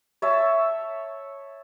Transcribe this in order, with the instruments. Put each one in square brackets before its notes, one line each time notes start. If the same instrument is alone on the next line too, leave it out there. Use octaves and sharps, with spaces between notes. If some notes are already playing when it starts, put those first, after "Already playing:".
[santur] C#5 E5 A5